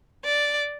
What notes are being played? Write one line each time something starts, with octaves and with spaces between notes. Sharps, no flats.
D5